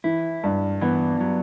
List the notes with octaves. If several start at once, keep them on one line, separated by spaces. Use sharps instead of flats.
E3 E4
G2
E3 B3
F#3